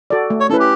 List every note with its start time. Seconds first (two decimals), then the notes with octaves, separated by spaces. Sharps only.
0.10 F#4 A4 D5
0.30 A3
0.40 C#5
0.50 C#4 E4 A4 B4
0.60 G4